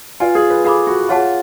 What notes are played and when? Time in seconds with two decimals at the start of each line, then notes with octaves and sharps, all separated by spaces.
0.20 F4 B4 D5 G#5
0.35 G#4
0.50 B4
0.65 G#4 A4 F5 B5 D6
0.87 F#4
1.09 F4 G#4 C#5 F#5 A5